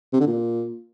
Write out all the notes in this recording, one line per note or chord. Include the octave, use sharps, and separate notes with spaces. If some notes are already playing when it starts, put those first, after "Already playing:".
C3
D3
A#2